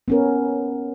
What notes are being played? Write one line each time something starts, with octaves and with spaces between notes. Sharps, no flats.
B3 C#4 A#4